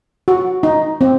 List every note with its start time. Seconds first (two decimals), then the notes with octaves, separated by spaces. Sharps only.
0.28 F#4
0.63 D#4
1.01 C4